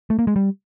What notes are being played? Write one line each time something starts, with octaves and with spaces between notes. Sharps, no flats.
A3
A#3
G#3
G3